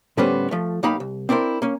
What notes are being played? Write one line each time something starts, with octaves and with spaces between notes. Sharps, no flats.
A2 D3 G3 B3 C#4 C5
F3 A3
B1 A#3 D#4 G4 F5 B5
C2
C4 D4 E4 A#4 C5
A#3 C#4